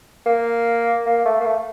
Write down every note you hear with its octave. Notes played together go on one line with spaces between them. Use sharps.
A#3
A#3
A3
A#3
A3